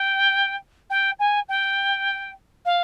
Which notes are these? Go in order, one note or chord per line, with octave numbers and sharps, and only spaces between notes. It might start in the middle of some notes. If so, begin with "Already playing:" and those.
Already playing: G5
G5
G#5
G5
F5